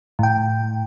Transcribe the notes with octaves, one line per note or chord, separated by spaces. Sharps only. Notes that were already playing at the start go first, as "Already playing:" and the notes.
A2 G5